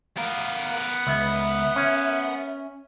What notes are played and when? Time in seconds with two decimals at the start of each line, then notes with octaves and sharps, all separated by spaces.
0.17 B3 A#4 F5
1.07 C#2 E5
1.76 C#4